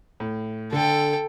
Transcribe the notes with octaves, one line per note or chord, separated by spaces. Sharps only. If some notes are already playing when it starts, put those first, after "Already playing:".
A2
D3 A4 G5